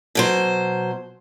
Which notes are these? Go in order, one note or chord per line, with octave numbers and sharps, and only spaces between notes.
B2 F#3 C5